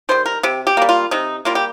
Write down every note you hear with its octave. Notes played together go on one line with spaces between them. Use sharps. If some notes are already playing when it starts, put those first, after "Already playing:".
D#3 G3 C5
A#4
C3 G4
G4
G3 A#3
F4
C3 D#4
G3 A#3 F4
G4